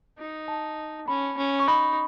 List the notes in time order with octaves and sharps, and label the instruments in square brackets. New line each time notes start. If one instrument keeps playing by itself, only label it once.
[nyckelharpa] D#4
[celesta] A5
[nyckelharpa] C#4 [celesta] B5
[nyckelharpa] C#4
[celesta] C#6
[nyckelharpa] D#4 [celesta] B5